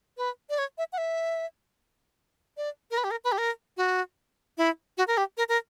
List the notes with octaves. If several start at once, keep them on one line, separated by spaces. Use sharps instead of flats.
B4
D5
C#5
E5
F#5
E5
D5
A#4
B4
G4
A#4
B4
G4
A#4
F#4
E4
F#4
A#4
G4
A#4
A#4